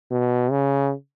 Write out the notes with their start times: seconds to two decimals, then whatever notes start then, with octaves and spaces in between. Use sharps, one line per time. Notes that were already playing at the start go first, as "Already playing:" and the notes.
0.11 B2
0.51 C#3